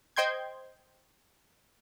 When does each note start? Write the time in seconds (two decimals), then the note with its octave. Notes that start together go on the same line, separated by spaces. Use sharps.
0.16 C5 D#5 G5 C6 G6 G#6